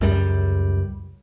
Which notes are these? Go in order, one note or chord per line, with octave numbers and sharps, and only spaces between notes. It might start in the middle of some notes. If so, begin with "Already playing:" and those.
C#2 F#2 G3